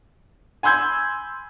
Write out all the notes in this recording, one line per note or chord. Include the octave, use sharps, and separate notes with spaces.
G#5 B5 C6 E6 G6 G#6